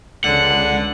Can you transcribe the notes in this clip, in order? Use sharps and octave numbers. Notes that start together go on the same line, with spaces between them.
C#2 D3 F#5